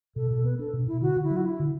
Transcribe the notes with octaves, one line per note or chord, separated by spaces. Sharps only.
B2 A4
B2 A4
B3 B4
D4 A4
B2
B2 E4
D3 F#4
D3
E4
F#3
F#4
D4 E4
D3